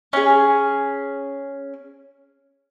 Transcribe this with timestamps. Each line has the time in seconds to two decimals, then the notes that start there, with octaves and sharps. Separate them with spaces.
0.13 C#4 G#4